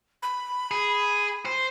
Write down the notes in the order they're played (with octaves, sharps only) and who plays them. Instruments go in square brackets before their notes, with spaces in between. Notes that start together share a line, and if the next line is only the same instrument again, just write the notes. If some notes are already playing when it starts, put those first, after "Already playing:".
[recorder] B5
[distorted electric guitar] G#4
C5